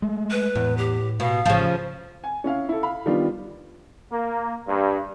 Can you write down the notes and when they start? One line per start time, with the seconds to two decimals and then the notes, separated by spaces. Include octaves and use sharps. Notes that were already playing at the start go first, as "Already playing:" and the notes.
0.02 G#3 A3
0.31 B4
0.55 E2 A2
0.78 G4
1.20 B2 F5
1.46 A1 C#3 F3
2.24 G#5
2.44 C#4 E4 F5
2.69 E4 A4
2.83 F5 B5
3.06 D#3 G3 B3 D4 F4
4.11 A#3
4.67 G2